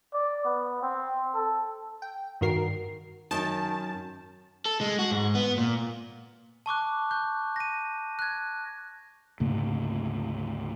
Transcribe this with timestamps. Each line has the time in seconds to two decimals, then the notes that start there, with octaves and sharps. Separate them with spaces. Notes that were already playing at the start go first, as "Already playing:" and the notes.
0.13 D5
0.45 B3
0.82 C4
1.34 A4
2.02 G5
2.41 G2 D#3 F#4 A#4 C7
3.31 F#2 D#3 A5
4.66 A4
4.81 G#3
4.99 F#4
5.11 G#2
5.35 B3
5.58 A#2
6.66 A5 C#6 D6 F#6
7.11 C#6 F#6 G6
7.56 A#6 D#7
8.19 F#6 G#6
9.40 D2 G#2 C#3 A#3